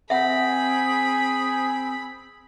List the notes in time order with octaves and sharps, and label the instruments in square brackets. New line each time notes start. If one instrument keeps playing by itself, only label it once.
[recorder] C4 [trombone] G#4 [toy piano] E5 F#5 [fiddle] B5